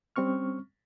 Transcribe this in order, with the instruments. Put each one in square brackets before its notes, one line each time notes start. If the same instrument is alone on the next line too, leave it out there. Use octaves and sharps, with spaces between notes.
[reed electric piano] G3 C4 C#4 C#6 F6